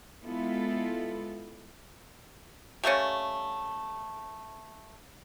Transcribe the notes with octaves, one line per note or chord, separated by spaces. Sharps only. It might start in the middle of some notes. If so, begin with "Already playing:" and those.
G#3 B3 E4 F4 A4
G3 A3 A#3 C#4